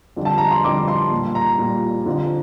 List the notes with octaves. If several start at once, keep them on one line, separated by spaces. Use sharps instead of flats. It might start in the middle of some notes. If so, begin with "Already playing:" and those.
F2 D3 G3
A5
A#5
C6
F2 D3 G3 D6
C6
A#2 G3
A#5
A#2 G3
F2 D3 F3